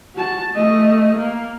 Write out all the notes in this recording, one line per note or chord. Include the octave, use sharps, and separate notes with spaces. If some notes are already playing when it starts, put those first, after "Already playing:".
F#4 A5
A3 D#5
A#3